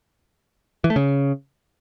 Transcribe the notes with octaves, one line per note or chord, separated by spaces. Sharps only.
E3
A3
C#3